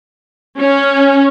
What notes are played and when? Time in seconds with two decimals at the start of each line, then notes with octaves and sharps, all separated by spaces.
0.58 C#4